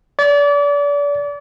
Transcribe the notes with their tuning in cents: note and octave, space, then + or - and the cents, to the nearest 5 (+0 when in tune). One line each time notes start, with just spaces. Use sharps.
D5 -35